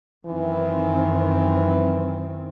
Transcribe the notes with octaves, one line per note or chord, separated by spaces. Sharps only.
F#2 D#3 E3 C4